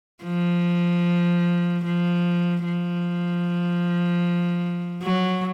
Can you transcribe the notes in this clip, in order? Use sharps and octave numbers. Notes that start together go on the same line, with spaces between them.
F3
F3
F3
F#3